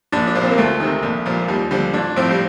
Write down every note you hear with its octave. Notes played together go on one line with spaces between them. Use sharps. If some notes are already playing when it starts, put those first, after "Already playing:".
A#1 D4
D4
A#2 F3
C4
A#3
D2 A3
C3 D#3
A#1
A#2 F3
D#2 G3
D3 F3 G3
A1 D4
A2 F3 C4
G3